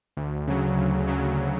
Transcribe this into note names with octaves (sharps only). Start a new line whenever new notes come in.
D2
C#3 F#3
D2
C#3 F#3